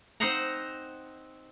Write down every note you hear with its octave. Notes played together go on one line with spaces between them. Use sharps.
C4 D#4 C5 D#5 F#5 A#5